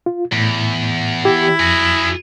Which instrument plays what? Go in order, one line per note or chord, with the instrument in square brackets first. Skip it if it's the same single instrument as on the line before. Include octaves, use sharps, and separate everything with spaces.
[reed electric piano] F4
[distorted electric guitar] E2 [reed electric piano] A2
[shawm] E4 [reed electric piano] G4
[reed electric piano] F2 [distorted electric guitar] F#4 G#4